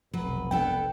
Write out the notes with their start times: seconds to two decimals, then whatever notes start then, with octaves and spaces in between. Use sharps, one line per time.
0.13 F1 B1 F#3 B4
0.51 B3 D4 A4 G5